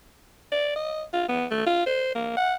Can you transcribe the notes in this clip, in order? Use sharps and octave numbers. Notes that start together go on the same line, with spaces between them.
D5
D#5
F4
B3
A3
F4
C5
A#3
F#5